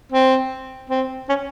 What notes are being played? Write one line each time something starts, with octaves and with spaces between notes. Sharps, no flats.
C4
C4
C#4